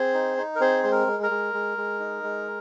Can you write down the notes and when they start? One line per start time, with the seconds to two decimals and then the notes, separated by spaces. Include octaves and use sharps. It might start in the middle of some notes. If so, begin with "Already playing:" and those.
Already playing: C4 G#4 C5
0.14 D#4
0.38 D#4
0.56 A#4
0.60 C4 G#4 C5
0.83 G#3 C5
0.92 A#4
1.07 G#3
1.23 A#4
1.31 G#3
1.54 G#3
1.77 G#3
2.00 D#4
2.23 G#3